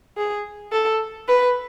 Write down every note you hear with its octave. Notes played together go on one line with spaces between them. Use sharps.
G#4
A4
B4